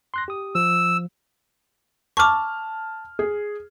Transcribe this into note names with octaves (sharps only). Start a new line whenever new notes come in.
C6 F#6 A#6
G4 D#6
F3 E6
A5 C#6 D6 F6
G#4